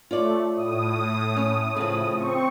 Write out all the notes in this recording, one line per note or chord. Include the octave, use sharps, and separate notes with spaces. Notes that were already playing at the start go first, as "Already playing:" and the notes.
A3 F4 C#5 D5
A2 D#6
C#4
C#3 F3
C4 C#6